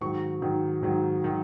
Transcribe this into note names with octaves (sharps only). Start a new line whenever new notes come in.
G#2 D#3 F#3 C#6
G#2 D#3 F#3
G#2 D#3 F#3
D#3 F#3